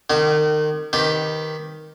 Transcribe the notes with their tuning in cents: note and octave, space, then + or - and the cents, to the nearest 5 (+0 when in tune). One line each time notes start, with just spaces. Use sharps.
D#3 -35 G4 -40
D#3 +0 G4 +0 B4 +20